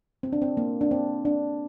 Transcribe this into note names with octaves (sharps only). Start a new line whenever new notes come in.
C4
D4
C4
A#3
D4
C4
D4